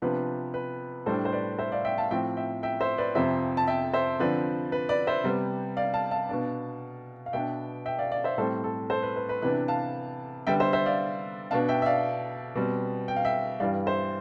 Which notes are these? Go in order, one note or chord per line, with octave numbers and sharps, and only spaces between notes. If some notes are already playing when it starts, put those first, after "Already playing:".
C3 F3 B3 D4 B4
B4
A2 G3 D4 A4 C5
C5
B4 D5
C5 E5
D5 F5
E5 G5
F5 A5
A2 F3 C4 E5 G5
E5 G5
E5 G5
C5 E5
B4 D5
F2 C3 F3 C5 E5
A5
E5 G5
C5 E5
D3 F3 C4 B4 D5
B4
B4 D5
C5 E5
C3 G3 B3
D5 F5
F5 A5
F5 A5
B2 B3 D4
F5
B2 B3 D4 E5 G5
E5 G5
D5 F5
D5 F5
C5 E5
A2 G3 C4 A4 C5
A4
A4 C5
B4
B4
B4
C3 E3 B3 D4 B4
F5 A5
D3 G3 B3 E5 G5
C5 E5
C5 E5
D5 F5
B2 B3 D4 F5 A5
E5 G5
E5
D5 F5
B2 G3 C4
G5
F5
E5 G5
G2 E3 G3 D5 F5
C5 E5